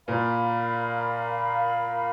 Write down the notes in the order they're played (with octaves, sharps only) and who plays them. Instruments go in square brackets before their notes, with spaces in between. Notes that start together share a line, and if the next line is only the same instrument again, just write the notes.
[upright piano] A#2 [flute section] A#4 F5 B5